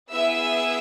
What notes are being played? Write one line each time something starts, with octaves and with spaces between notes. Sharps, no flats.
B3 E4 G#4 E5 E6